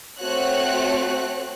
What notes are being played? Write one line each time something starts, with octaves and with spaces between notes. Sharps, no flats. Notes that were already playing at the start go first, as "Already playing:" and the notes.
A3 C4 F#4 C#5 F#6